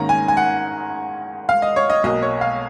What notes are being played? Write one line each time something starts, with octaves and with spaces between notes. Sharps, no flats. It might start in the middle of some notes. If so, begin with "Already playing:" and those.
Already playing: G#2 D#3 A#3 C#4 A#5
G#5
G#5
F#5
F5
D#5
C#5
D#5
B1 B2 A#3 D#5
C#5
F5